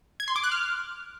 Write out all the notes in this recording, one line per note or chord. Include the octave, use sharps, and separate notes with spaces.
G#6
C6
D6
F#6
F6